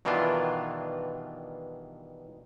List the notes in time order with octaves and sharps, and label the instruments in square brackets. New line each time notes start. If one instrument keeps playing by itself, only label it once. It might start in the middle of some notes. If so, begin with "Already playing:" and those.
[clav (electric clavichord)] G2 B2 D#3 E3 D4 F4